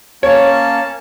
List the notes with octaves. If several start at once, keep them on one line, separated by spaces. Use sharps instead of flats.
A#3 C#4 C#5 A5